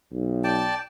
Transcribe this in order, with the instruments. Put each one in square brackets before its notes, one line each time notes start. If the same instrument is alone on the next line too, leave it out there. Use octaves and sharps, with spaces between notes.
[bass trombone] B1
[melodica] D5 G5 A5